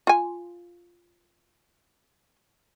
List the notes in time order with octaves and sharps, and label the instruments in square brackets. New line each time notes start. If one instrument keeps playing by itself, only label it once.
[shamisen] F4 G#5